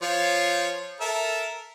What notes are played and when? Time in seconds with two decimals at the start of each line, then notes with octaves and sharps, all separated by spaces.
0.02 F3 F4 C#5
1.01 A4 A#4 E5